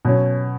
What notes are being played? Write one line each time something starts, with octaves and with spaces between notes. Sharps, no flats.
B2 F#3 C#4